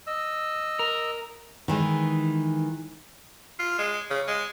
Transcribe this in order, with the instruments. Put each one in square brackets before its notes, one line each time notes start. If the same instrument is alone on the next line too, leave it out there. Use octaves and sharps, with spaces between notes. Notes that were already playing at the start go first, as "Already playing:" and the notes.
[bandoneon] D#5 E6
[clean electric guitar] A#4
[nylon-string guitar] D#3 E3 G#3
[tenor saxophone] F4
G#3
C#3
G#3